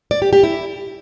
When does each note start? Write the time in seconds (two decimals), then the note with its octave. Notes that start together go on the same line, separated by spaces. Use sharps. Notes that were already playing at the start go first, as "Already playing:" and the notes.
0.11 D5
0.22 G4
0.33 G4
0.43 E4